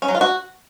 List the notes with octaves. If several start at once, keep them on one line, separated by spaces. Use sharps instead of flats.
C#4
F#3
F4
F#4